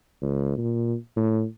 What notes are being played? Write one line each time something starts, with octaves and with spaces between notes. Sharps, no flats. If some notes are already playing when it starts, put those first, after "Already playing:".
C#2
A#2
A2